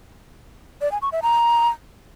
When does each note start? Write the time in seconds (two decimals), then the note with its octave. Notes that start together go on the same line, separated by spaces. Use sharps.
0.81 D5
0.92 G#5
1.02 C#6
1.12 E5
1.22 A#5